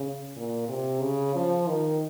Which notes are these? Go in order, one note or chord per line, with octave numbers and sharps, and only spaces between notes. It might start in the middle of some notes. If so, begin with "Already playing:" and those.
Already playing: C#3
A#2
C3
C#3
F3
D#3